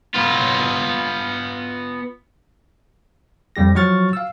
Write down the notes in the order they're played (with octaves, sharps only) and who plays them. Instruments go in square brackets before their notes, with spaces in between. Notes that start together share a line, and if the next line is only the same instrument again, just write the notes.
[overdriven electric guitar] B3 F4
[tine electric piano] F2 G3 G4 A#6
F3 F#3 F#4 C#6 F6 A6
F5 E6